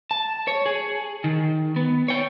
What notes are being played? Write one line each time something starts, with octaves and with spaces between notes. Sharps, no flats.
A5
C#5
G#4
D#3
B3
C#5 G5